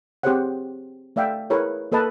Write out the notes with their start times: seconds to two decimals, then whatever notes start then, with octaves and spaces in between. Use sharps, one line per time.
0.23 C4 G4 G#4 C5 C#5 F#5
1.16 A3 D5 E5 F5 G5
1.50 E4 G#4 A#4 B4 C#5
1.92 A#3 A4 B4 D#5 A5